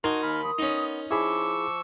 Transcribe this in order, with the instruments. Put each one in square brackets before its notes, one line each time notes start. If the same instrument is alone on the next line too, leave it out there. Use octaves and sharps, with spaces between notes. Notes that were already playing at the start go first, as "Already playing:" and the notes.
[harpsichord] D#4 G#5 A5 [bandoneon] F#4 [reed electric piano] A#4 C6
[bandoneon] D#2 B5 [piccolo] F6
[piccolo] D#6
[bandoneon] B3 [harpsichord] C#4 D#4
[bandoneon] F3 C#6 E6 [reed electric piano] E4 G#4 B5 [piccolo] D6